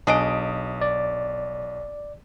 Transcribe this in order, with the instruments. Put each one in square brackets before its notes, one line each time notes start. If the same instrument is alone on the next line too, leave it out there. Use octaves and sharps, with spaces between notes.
[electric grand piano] B1 D#6 D7 [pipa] D4 G#4 D#5
[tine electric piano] D5